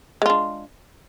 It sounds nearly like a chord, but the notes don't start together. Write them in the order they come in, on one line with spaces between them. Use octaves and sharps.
G#3 F4 D4